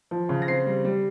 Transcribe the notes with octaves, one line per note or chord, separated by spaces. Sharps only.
F3
C#3
A#6
C4 C7
G3
G3